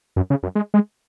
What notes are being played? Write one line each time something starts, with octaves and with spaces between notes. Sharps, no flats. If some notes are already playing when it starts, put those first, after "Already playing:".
F#2
C#3
F#2
G#3
G#3